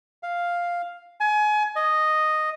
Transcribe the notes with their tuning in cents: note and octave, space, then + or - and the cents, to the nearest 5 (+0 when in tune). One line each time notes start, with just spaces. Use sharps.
F5 +0
G#5 +30
D#5 -5